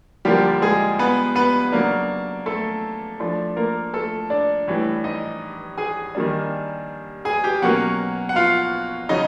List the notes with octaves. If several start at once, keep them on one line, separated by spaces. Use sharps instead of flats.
D3 F3 G3 A#3 D4 G4
G#3 G#4
B3 B4
B3 B4
C#3 F#3 A#3 D4 A#4
A3 A4
F3 A3 D4
A#3 A#4
A3 A4
D4 D5
A2 E3 G3
D#4 D#5
G#4 G#5
D#3 G3 A#3 D4
G#4 G#5
G4 G5
B2 F#3 A#3 C#4 F#4 F#5
F#5
F4 F5
C#3 F#3 D#4 D#5